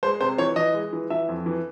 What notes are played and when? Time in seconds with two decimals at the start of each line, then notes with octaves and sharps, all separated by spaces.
0.03 G#3 C5
0.21 C3 C5
0.38 E3 C#5
0.56 E3 D#5
0.74 G#3
0.93 E3
1.10 E3 E5
1.28 F2
1.46 E3